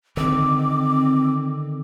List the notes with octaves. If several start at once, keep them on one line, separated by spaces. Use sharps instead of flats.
D3 D#3 C4 D6